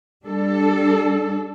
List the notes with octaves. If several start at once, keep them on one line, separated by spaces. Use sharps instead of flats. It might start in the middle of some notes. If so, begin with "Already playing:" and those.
G3 D4 A4